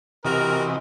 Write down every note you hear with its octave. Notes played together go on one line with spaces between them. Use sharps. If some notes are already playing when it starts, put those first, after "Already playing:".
C3 E3 F#4 G4 A#4 D#5